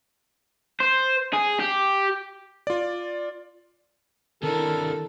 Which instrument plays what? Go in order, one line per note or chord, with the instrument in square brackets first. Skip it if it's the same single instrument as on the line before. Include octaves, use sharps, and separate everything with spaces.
[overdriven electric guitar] C5
G#4
G4
[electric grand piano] F4 D5
[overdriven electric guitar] C3 D4 [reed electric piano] D#3 [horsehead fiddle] E4 A#4 [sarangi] A4